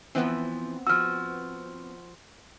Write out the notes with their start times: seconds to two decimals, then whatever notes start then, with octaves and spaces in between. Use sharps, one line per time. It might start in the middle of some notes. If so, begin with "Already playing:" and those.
0.15 E3 F3 B3 C4
0.87 F3 F#4 E6 F6